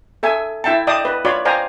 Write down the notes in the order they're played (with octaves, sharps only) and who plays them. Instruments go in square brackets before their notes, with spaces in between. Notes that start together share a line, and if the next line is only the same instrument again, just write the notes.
[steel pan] A4 E5 G#5
E4 E5 G5 A5
D5 D#5 G5 A5 D6 D#6
B4
F4 C#5 D5 B5
C5 D5 F5 G5 G#5 A#5